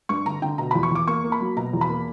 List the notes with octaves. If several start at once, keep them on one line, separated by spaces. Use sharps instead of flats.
G2 C#6
D3 A#5
D3 G5
B2 A#5
E2 B5
C#6
E2 D6
A#3 C#6
A#3
B5
F#3
B2 A#5
E2
B5
A#3